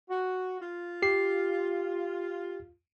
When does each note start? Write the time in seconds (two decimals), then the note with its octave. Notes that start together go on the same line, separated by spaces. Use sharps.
0.09 F#4
0.59 F4
1.02 G4 C7